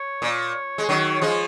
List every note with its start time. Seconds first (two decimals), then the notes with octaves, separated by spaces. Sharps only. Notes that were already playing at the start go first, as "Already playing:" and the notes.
Already playing: C#5
0.22 A#2
0.78 G#3
0.89 D#3 F#3
1.21 F3 G#3